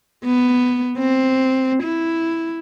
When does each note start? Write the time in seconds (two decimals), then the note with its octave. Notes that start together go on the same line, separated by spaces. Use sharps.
0.24 B3
0.98 C4
1.83 E4